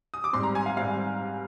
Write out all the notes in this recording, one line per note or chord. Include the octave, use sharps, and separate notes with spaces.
D#6
D6
G#2 G3 C4 C6
A#5
G#5
F5
G#2 G3 C4 F5